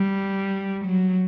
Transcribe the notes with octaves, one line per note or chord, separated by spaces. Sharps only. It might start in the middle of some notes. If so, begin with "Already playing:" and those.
Already playing: G3
F#3